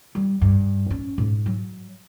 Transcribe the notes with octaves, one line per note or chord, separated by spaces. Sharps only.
G3
G2
C#4
G#2
F#3